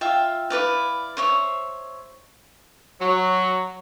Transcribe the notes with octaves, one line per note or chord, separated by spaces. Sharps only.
F4 E5 F5 G5
E4 B4 D5 F5
C5 C#5 E5
F#3